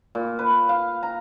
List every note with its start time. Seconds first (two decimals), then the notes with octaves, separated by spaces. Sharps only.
0.15 A#2
0.39 B4
0.69 F5
1.03 A#5